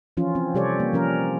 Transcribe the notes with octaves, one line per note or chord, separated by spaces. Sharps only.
E3 F3 C#4 F4
C4
C3 G3 G4 A4 C#5 D5
A#3
F3 C#4 A#4